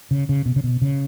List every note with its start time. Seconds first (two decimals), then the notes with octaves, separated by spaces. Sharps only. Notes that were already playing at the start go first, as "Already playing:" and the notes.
0.11 C#3
0.29 C#3
0.46 B2
0.56 C#3
0.64 B2
0.82 C#3